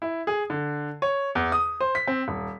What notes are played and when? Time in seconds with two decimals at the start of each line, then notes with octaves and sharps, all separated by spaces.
0.02 E4
0.27 G#4
0.50 D3
1.02 C#5
1.35 E2
1.52 D#6
1.80 C5
1.95 B6
2.08 C4
2.28 D#1